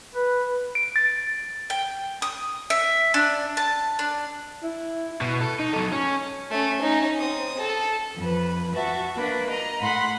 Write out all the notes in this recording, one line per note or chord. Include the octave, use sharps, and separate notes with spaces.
B4
D7
A6
G5
D#6
E5
D4
A5
D4
E4
B2
A4
D#4
F#3 A4
C#4
A3 C#4
C#4 D#4
C4 D#6
A4
F2 B4
F#4 E5 A5
A#3 D4 B4
D#5 A#5
A2 F#5 B5 C6